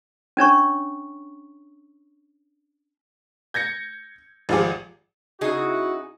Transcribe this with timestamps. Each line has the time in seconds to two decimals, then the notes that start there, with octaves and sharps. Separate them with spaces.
0.37 C#4 D4 C#5 C#6
3.54 G6 G#6 A#6 C#7
4.49 G#1 F3 F4 G4 G#4 D6
5.41 C#3 D#4 E4 F#4 G#4